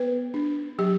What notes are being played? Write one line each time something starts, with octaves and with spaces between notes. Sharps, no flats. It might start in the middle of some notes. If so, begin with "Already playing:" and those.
Already playing: B3 B4
D4
F#3 G4